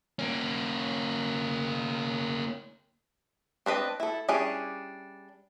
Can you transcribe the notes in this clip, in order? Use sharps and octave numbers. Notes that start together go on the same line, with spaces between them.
A#3 C#4
C4 D4 B4 D#5
E4 A4
G3 C#4 D4 E4 G#4